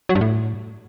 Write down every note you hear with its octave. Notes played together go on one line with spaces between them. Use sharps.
F#3
G2
A2